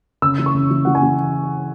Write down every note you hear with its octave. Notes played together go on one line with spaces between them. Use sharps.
C#3 E6
E3
C#6
C#3
E3
E3 F#5
G#5
E3